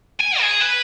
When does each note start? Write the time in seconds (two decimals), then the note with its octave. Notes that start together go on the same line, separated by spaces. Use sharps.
0.20 G#5
0.40 G#4
0.60 B4